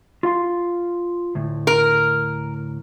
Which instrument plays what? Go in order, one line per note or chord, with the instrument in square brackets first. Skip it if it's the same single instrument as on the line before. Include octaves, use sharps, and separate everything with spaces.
[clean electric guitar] F4 F5 C6
D2 A2
[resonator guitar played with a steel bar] A#4